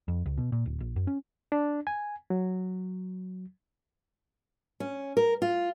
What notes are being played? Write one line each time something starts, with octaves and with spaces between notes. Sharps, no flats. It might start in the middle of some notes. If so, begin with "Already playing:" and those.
F2
C#2
B2
A#2
D1
A#1
F#2
C#4
D4
G#5
F#3
C#4
A#4
F4